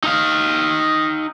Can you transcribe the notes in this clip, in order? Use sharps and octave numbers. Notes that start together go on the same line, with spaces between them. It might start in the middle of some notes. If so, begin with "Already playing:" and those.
D#4 F5